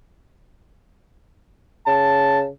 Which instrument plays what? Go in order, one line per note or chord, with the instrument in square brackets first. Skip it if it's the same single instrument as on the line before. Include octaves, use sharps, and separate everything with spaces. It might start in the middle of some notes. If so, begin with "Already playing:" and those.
[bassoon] C#3 [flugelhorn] A5